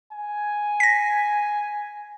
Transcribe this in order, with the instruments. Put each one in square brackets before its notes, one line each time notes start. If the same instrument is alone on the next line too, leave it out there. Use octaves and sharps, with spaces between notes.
[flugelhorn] G#5
[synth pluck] A#6 B6